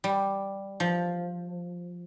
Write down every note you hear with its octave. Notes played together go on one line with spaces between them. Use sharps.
G3
F3